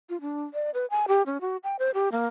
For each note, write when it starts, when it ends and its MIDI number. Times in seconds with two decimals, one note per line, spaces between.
0.09 0.20 65
0.21 0.43 62
0.54 0.70 74
0.74 0.86 71
0.90 1.06 80
1.08 1.23 67
1.26 1.40 61
1.41 1.57 66
1.64 1.76 79
1.79 1.91 72
1.94 2.09 67
2.12 2.26 58